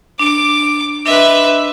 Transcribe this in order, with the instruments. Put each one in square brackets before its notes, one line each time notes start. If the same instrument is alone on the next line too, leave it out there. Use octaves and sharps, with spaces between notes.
[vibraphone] D4 [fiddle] D6
[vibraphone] D4 D#5 C6 [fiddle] B4 E5